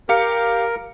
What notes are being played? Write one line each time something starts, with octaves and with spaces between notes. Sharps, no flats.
G4 A#4 F5 C#7